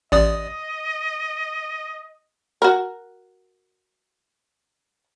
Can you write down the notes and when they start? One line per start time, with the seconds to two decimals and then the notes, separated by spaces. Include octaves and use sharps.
0.12 A1 D5 D#5 D#6
2.62 F#4 A#4